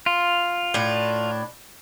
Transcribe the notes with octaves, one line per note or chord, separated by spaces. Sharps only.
F4
A2 D4